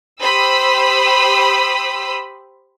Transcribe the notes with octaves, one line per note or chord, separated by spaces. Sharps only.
G4 C5 B5 D#6 E6